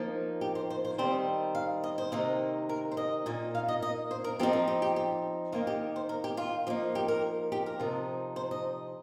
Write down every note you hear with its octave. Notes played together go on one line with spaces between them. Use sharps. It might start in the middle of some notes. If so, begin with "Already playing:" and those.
Already playing: F3 A#3 D#4
G4
C5
C5
C5
D#3 G3 C4 D#4 C5
F5
D#5
C5
C3 D#3 A#3 D#4
A#4
C5
D#5
A#2 A#3 D#4
F5
D#5
D#5
C5
A#4
F3 C4 D#4 G4
A#4
G4
G4
G4
D#3 A#3 D#4 F4
G4
C5
A#4
G4
F4
F3 A#3 D#4
G4
A#4
G4
A#4
C3 F3 D#4
C5
D#5